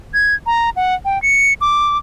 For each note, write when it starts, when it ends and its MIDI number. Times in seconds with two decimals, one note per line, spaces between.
0.14 0.35 92
0.46 0.70 82
0.76 0.95 78
1.05 1.21 79
1.22 1.53 97
1.61 1.97 86